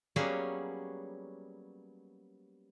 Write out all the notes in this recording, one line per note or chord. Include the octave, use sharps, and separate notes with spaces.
F#3 G3 A#3 B3 C#4 G#4